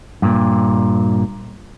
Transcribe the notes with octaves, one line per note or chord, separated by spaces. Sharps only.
G2 A#2